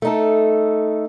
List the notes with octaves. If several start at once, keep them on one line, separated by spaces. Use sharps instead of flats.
A3 D#4 A4